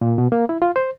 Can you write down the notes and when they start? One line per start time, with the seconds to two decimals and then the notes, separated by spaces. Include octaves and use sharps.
0.01 A#2
0.18 B2
0.32 A#3
0.49 E4
0.62 F4
0.76 C5